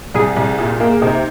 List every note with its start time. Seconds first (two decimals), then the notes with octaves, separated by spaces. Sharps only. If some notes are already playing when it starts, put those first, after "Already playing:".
0.14 C2 G#4
0.36 C2
0.58 A#2
0.80 A#3
1.02 C3 D#4